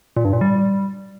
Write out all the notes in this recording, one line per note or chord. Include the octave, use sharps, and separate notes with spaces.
A#2
G2
A#2
G3